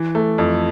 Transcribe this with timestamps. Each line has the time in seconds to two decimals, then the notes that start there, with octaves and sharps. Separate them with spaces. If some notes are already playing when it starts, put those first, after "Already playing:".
Already playing: E3
0.15 A3
0.38 F2